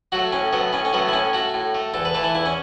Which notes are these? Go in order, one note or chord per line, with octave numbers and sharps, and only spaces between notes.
F#3 A3 F#4
A2 C#4
F#3 A3 B3
A2 C#4
C#4
F#3 A3 B3
E4
A2 C#4
A3 F#4
A2
A3
E2 A4
B4
E3 A3 A4
E4
E2 E4
C#4